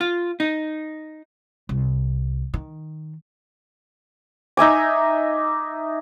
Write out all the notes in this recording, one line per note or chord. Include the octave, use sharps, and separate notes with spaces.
F4
D#4
C2
D#3
D#4 E5 G#5 D6